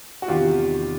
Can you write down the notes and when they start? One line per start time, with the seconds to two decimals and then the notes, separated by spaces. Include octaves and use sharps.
0.22 F#4
0.28 E2 C3 D#3 F4 G4